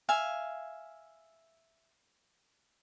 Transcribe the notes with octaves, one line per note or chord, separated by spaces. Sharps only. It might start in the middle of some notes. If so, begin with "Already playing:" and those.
E5 F5 G#5